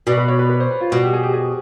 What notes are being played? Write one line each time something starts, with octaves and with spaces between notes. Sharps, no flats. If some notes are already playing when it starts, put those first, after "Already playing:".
B2 D5
B4
C#5
B4
B4
C5
B4
F4
B2 F#4
G4
G#4
G4
G#4